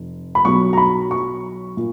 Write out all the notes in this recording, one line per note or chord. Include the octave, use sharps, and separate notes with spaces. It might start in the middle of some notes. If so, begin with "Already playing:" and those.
Already playing: F1
B5
B1 B2 F#3 C#6
A#5
B5
C#6
A#2